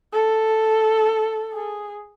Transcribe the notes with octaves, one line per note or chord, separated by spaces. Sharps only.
A4
G#4